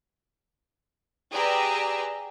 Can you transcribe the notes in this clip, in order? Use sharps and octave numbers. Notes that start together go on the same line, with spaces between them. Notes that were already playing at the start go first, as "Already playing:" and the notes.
G4 G#4 B4 D5 A#5 E6